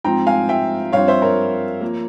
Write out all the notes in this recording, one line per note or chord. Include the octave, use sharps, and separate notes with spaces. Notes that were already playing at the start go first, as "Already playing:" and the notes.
G#2 F3 C4 G5 A#5
F5 G#5
E5 G5
G2 F3 C4 C#5 F5
C5 E5
A#4 C#5
F3 A#3